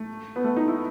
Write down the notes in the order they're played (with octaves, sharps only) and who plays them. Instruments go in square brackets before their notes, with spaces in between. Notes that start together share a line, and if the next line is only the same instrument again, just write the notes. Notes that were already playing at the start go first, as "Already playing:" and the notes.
Already playing: [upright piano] A3
B3
A3
D#4
E4